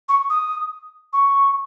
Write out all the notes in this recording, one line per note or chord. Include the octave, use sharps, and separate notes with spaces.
C#6
D#6
C#6